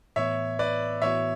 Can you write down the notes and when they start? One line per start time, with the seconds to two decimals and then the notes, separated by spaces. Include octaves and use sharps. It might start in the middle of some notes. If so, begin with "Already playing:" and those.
0.16 A2 E3 B3 C#5 E5
0.59 B4 D5
1.02 A2 E3 B3 F#4 C#5 E5